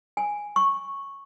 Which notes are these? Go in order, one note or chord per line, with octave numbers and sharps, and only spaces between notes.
G#5
C#6